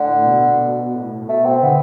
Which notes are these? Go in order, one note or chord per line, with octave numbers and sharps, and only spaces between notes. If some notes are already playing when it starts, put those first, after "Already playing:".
Already playing: A2 D3
B2
A2
A2
B2 A3
C4
D3 B3